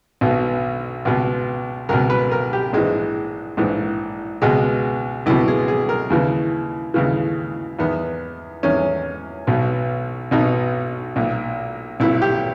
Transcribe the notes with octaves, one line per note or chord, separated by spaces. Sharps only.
B1 B2
C#2 B2
C#2 B2 A#4
B4
A#4
G4
A#1 G#2 E3 G#3
A#1 G#2 E3
C#2 B2 G#3
C#2 B2 E4
G#4
G#4
A#4
D#2 C#3 E3
D#2 C#3 E3
E2 D#3 B3
E2 D#3 C#4
B1 B2
B1 B2 D#4
B1 A#2
B1 A#2 E4
G4